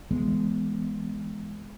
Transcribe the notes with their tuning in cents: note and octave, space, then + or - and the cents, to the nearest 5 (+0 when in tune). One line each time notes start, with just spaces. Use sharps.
E3 +0 G#3 +0 B3 +0